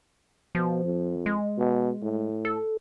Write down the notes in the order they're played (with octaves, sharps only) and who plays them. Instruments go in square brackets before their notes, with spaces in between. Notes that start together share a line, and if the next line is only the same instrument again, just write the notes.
[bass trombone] B2 [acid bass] F3
[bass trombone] F2
[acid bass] G#3
[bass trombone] B2
A2
[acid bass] A4